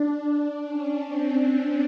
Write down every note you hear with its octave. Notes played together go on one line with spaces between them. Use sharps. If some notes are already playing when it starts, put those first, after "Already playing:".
Already playing: D4
D4
C#4
C4
C#4